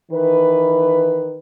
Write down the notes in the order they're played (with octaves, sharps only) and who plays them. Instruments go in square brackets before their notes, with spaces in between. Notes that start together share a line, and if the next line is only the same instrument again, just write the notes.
[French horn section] D#3 E3 B4